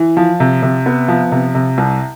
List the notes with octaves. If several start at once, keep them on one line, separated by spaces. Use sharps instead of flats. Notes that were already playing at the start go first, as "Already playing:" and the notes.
Already playing: E3
F3
C3
C3
B3
F3
C3
C3
C2